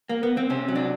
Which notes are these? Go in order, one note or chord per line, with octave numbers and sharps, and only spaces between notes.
A#3
B3
C4
C3 C#4
F#3
D4